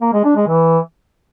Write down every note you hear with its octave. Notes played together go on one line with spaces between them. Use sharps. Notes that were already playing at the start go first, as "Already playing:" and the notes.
A#3
G#3
D4
G#3
E3